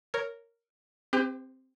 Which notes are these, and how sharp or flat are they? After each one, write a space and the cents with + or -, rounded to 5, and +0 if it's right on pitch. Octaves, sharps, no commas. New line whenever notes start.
A#4 -5 C#5 +5
C4 +0 G4 +30 C5 -45